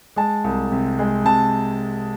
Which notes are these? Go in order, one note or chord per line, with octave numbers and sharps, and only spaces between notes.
G#3 A5
C2
C3
G#3
C3 A5